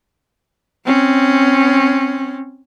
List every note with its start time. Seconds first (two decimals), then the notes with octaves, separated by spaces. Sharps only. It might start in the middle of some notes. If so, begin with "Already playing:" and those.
0.85 C4 C#4